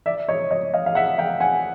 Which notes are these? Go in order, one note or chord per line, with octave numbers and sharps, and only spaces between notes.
D5 E5
C#5 D#5
C#5 D#5
D#5 F5
F5
E5 F#5
F5 G5
F#5 G#5